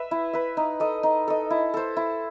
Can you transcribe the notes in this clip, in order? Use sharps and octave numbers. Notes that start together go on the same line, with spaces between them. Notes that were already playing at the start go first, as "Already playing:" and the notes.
Already playing: B4 E5
E4
B4 E5
D#4
A4 D#5
D#4
A4 D#5
E4
A4 C5
E4